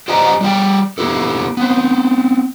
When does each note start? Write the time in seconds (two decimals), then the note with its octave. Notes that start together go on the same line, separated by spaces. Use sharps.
0.08 G4 C5 D5 D#5 G#5 A#5
0.41 G3 G#4 G5
0.98 A#3 B3 E4 G4 A4
1.57 B3 C4